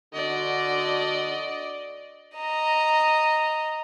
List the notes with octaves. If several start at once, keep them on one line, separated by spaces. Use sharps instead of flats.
D3 F#4 D5 D#5
D#5 A#5